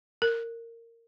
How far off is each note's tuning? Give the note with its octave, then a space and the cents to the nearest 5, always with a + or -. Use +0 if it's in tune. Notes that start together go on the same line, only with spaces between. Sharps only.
A#4 -20